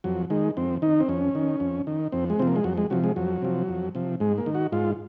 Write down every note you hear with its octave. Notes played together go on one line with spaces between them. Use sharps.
F2 F#3
D#3 G#3
F2 C4
D#3 D#4
C4
F2 C#4
D#3
F2
D#3
F2 C4
G#3
C3 F3 C4
A#3
G#3
F2 F#3
G#3
C3 F3 F#3
G#3
F2 F#3
C3 F3
F2
C3 F3
G#2 G#3
A#3
D#3
F#4
G#2 F4